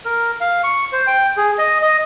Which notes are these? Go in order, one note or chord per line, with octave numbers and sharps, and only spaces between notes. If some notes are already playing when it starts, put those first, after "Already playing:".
A#4
F5
C#6
C5
G5
G#4
D#5
D#5